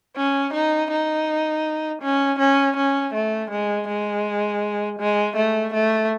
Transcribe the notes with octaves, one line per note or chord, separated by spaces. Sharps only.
C#4
D#4
D#4
C#4
C#4
C#4
A3
G#3
G#3
G#3
A3
A3